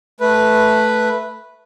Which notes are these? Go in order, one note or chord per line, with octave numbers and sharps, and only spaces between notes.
A3 B4